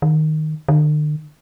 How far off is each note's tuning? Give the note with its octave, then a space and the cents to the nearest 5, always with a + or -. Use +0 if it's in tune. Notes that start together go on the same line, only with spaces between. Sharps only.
D#3 -5
D3 +45